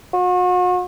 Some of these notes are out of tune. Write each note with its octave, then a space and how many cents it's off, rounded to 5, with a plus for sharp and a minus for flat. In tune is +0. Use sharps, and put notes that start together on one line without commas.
F#4 -40